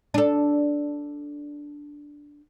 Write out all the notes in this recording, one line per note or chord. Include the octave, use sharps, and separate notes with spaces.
D4 A4